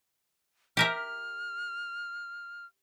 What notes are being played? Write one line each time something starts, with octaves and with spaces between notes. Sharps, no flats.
G4 A#4 E5 F6